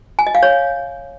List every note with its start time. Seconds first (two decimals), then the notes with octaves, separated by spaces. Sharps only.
0.19 G#5
0.27 D#5
0.35 F5
0.43 C#5